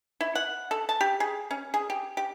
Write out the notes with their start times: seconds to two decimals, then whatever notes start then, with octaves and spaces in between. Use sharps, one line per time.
0.21 E4
0.35 F#5
0.71 A4
0.89 A5
1.01 G4
1.20 G#4
1.51 C#4
1.74 G#4
1.90 G4
2.17 G4